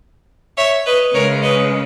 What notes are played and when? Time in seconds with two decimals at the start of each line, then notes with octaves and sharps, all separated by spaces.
0.57 C#5 E5
0.86 B4 D#5
1.14 C#3 G#3 C#4 A#4 C#5
1.43 B4 D#5